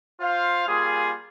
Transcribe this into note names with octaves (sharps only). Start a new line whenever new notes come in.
F4 C5 F5
G3 A#3 F4 G#4